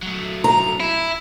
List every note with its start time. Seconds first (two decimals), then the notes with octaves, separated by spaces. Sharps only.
0.03 F#3 A3
0.44 A#5
0.80 E4